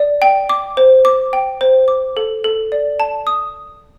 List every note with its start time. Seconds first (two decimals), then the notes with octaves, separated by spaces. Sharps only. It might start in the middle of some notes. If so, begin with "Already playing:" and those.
Already playing: D5
0.22 G5
0.49 D6
0.77 C5
1.05 D6
1.33 G5
1.61 C5
1.88 D6
2.17 A4
2.44 A4
2.72 D5
3.00 A5
3.27 D#6